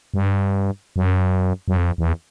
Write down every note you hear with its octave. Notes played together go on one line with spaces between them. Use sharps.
G2
F#2
F#2
F2
E2